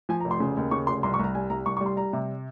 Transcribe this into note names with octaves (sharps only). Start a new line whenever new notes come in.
F3 G#5
A#5
F1
C6
C#3
D#2
C#3 C#6
F1 C6
C2 C6
C#6
C2
A#5
G3 G#5
C2 A#5
C2 C#6
C#6
G3
C6
G3 A#5
C3